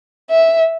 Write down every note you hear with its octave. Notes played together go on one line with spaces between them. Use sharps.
E5